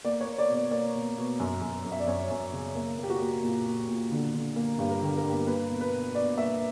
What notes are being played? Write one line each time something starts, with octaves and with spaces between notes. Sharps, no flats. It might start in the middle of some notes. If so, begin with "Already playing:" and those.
A#3 D5
C#5
A#3
D5
B2
D5
A#3 D5
B2
B2
F#2
F#2
F#2
E5
D5
F#2 C#5
F#2
C#3
A#3
A#3 G4
F#4
A#3
A#2
A#2
A#2
D3
D3
A#3
G2 G4
A#4
D3 G4
A#4
G2 G4
A#3 B4
B2
B4
B2
B2 D5
A#3 E5